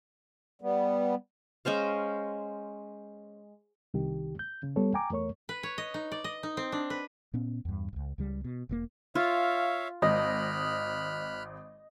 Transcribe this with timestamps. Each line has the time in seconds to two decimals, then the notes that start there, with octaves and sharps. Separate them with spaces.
0.62 G3 B3
1.65 G#3 C#4 C5 F5
3.94 C2 D#3 G4
4.39 G6
4.63 C#3
4.76 G3 B3 A4 C#5
4.94 G5 G#5 A#5 D6
5.10 E2 A3 A#4 C#5 C#6
5.49 B4
5.63 C#5
5.78 D#5
5.94 D#4
6.12 D5
6.24 D#5
6.43 D#4
6.57 C4
6.72 D4
6.90 B4
7.34 A#2 B3 C#4
7.65 E2 G2
7.93 D#1 C#2
8.18 C#2 C#3 G3
8.44 B2
8.69 E1 C3 A#3
9.15 F4 C#5 E5 F5
10.02 G#1 D#5 B5 F6 F#6